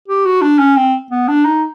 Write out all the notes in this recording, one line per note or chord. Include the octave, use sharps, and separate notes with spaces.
G4
F#4
D4
C#4
C4
B3
D4
D#4